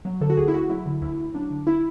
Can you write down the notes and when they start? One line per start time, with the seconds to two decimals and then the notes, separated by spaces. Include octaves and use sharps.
0.05 F#3
0.21 D3 A4
0.30 F#4
0.37 D2 G#4
0.48 E4
0.53 D2 F#4
0.69 F#3 E4
0.86 D3
1.01 D2 E4
1.18 D2
1.34 F#3 D4
1.51 D3
1.67 E4